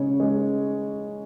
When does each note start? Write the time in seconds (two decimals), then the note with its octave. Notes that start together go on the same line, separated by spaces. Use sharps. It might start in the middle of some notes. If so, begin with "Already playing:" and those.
Already playing: C#3 G#3 C#5
0.20 G#3